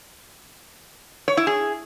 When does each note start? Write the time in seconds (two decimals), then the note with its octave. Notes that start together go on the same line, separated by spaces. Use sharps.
1.28 C#5
1.37 E4
1.47 G#4